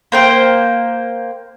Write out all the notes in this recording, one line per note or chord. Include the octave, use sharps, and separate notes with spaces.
A#3 C5 G5